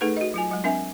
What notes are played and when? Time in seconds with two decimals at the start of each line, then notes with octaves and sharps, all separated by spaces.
0.01 A3 D#4 G#4 A4 B4
0.17 F#4 D#5
0.34 F#3 F4 G#5
0.51 F#3 G#3
0.64 C4 D4 A#4 E5 G#5